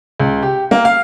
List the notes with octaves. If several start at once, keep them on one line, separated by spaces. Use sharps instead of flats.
C#2
G4
A#3
F5